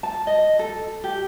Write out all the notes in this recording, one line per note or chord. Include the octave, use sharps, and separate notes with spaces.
A5
D#5
A4
G4